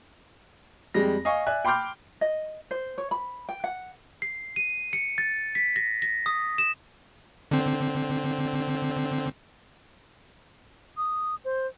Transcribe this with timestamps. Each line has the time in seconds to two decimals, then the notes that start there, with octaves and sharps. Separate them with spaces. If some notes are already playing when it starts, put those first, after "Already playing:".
0.94 F2 G3 G#3 A#6
1.25 D#5 F5 G#5 C#6
1.47 D5 E5 G#5 F#6
1.65 G5 B5 C6 D6 F6 G6
2.21 D#5
2.71 C5
2.98 C#5
3.11 B5
3.49 G5
3.64 F#5
4.22 C7
4.56 D#7
4.93 C#7
5.18 A6
5.55 B6
5.76 A#6
6.02 A#6
6.26 D#6
6.58 E7
7.51 D3 C4
10.97 D#6
11.45 C5